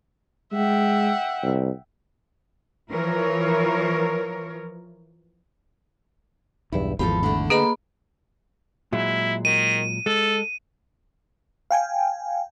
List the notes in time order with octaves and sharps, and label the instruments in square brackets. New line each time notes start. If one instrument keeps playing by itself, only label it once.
[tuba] G#3 [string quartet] E5 F#5 G5
[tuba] C2
[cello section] E3 F3 A#4 C#5
[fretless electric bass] B1 E2 G2 [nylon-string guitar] E4
[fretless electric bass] G#1 E2 [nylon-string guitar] F3 G4 A4 [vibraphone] B5
[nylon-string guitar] D3 A3
[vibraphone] A#3 B5 [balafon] G#4 B4 D#5
[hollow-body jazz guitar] A#2 F#3 G#3 [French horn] E4
[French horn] D#3 [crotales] D#7
[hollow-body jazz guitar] G#3 [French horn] A4
[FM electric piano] F5 G5 G#5